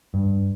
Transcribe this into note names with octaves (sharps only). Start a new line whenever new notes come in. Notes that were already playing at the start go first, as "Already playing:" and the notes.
G2